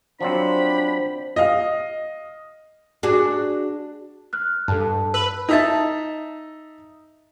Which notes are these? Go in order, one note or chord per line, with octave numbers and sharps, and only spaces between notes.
F3 F#3 C4 D4 C5 B5
D#5 F5
D4 F#4 G#4
F6 F#6
G2 A4 A5
A5
B4 E6 F#7
D#4 E5 A5